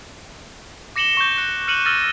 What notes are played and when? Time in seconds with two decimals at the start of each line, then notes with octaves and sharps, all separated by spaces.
0.96 D6 A#6 C#7 E7 F#7 G7
1.17 C#6 G6
1.38 F#6 C#7
1.68 F6 F#6 C#7 D#7 E7 F#7
1.85 E6 F6 A6 A#6 D#7